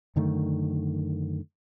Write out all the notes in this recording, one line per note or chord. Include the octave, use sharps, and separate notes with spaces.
F#2 D3 D#3 A3